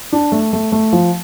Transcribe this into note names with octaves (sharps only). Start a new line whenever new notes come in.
D4
A3
A3
A3
F3